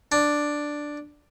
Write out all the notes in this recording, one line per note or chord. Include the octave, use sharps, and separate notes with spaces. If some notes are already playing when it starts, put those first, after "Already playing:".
D4